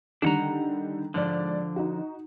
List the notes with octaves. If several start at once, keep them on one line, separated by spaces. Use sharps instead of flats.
D3 D#3 G3 D4 F#5 A#5
G#2 D3 F3 D5
D#4 F#4